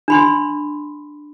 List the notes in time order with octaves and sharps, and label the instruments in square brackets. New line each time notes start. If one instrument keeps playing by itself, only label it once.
[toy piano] D4 B5 C6